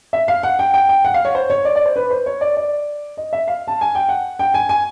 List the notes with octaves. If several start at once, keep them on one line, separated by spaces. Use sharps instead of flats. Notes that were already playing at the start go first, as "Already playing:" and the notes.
E5
F5
F#5
G5
G5
G5
F#5
F5
C#5
C5
C#5
D5
D5
C5
B4
C5
C#5
D5
D5
D#5
E5
F5
A5
G#5
G5
F#5
G5
G#5
G#5